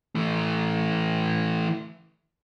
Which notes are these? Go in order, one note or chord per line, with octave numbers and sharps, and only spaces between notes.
E3 A3